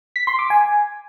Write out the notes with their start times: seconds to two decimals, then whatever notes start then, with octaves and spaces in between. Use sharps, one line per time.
0.16 B6
0.27 C6
0.39 D6
0.50 G#5